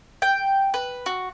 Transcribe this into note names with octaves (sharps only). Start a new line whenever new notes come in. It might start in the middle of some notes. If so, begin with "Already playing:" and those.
G5
B4
F#4